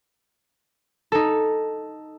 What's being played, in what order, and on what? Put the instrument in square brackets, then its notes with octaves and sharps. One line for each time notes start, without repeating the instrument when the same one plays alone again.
[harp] D#4 A4